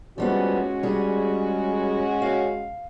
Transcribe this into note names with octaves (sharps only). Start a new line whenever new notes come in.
F3 G3 G#3 B3 C#4 F#4
G3 G#4
F5